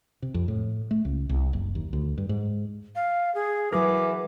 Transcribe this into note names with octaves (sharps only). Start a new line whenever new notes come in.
C3
F2
A2
A3
C#2
C2
F#1
D#2
D2
G2
G#2
F5
G#4
E3 F#3 G#4 A#4 D6